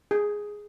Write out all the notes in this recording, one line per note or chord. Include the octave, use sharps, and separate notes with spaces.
G#4